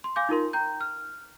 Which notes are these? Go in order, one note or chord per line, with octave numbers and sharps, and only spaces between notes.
C6
F5 G#5 D6 G6
D#4 F4 A#4 C6
G5 A#5 G6
F6